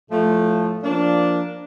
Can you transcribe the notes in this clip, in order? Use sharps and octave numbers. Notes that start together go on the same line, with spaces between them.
A2 F3 A3
F3 A#3 D4